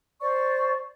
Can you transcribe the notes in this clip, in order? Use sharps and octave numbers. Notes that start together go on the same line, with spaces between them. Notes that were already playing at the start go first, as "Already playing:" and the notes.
C5 D5 C#6